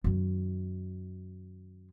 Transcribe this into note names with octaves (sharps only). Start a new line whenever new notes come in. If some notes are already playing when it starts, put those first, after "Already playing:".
F#2 D#3